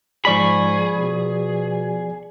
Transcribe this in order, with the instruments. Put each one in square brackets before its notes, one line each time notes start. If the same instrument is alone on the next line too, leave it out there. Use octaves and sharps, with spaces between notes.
[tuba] G#2 [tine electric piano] F3 D5 B6 [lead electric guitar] G#4 [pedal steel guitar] B5 C#6
[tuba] B2